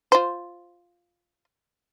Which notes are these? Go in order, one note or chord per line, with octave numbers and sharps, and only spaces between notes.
F4 C5